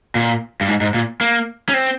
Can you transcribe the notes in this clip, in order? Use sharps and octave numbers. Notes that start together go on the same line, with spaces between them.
A#2
G2
G#2
G#2
A#2
A#3
C#4
C4